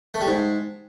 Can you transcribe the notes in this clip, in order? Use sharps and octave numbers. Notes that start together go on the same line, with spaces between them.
A3
G3
G#2